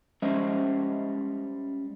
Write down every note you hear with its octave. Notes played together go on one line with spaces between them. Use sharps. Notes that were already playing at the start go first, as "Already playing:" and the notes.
G3 G#3 C#4 C5 D#5 E5